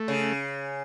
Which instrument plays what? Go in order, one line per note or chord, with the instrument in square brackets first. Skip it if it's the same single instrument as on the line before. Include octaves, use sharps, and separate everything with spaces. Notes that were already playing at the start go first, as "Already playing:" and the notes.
Already playing: [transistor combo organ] A3
[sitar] C#3